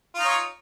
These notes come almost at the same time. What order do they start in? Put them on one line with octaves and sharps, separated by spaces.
F4 D#4 C#5